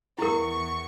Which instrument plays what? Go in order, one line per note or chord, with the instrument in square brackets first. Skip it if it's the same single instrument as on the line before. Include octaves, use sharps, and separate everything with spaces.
[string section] E2 C#6 [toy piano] E4 A#4